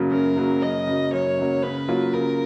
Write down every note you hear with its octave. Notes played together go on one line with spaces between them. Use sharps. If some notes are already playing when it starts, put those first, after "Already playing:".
Already playing: F#2 C#3 F#3 A#3
F#2 A#4
C#3 F#3 A#3
F#2 D#5
C#3 F#3 A#3
F#2 C#5
C#3 F#3 A#3
C#3 B4
F#3 A#3 F4 A#4
C#3 A#4